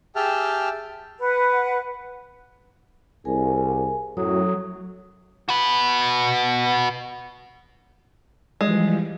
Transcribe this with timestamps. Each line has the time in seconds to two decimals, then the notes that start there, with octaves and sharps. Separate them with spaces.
0.16 G4 G#4 E5 G5 A5 F6
1.19 B4 F#5
3.25 C2 G#4 A#4 G#5
4.17 F#2 A2 F#3 A4 C#5 D#6
5.49 F#4 B4
8.61 E3 F3 G3 G#3